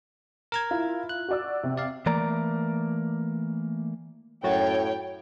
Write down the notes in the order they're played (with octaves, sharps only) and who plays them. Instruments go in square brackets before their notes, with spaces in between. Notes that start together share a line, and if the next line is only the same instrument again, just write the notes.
[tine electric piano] A#4 A#5 G#6
[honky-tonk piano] E4 F4
[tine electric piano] F#6
[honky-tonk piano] F#4 D5 E6
C3
[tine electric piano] D5 F5
[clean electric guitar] E3 A3 A#3 D5 A#5
[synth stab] F#2 F#4 A6 [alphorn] A2 [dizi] C#5 [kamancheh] G5